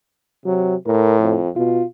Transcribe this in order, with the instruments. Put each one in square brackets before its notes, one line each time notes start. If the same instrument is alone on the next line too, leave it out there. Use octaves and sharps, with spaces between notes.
[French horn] C3 [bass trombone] F#3
[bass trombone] A2 [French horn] A#4
[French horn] F2
[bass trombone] B2 [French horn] F4